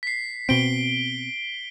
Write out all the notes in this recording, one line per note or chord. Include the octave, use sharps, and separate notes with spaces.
B6 C7
B2 C4 D7 G7